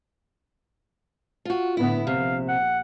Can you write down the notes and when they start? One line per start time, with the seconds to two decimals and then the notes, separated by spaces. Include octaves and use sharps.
1.45 F4 F#4
1.77 A2 D3 B3 E4
2.07 A#1 C3 F5
2.49 F#5